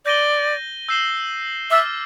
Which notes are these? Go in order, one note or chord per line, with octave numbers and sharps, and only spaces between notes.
D5 G6 A#6 D#7 G7
E6 G6 C7 E7 G7
E5 D6 F6 A6